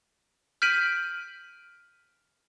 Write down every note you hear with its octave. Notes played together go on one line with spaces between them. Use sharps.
F6 G6 B6 D7 D#7 F#7